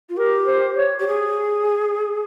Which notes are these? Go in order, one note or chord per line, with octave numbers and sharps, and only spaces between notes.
F4
G4 A#4
C5
C#5
G4
G#4